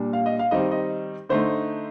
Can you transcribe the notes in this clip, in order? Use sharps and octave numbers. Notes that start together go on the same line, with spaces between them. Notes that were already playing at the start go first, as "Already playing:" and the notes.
Already playing: A#2 G3 D4
F5
D#5
F5
D#3 G3 C4 D#4 D#5
D#5
D3 A3 D#4 C5